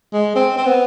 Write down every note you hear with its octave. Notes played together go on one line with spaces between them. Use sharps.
G#3
C4
C4
B3